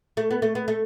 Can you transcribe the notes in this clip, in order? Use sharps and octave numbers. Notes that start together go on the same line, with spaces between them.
A3
B3
A3
B3
A3